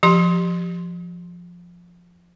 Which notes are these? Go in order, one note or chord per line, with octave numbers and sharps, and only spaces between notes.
F3 G4 C6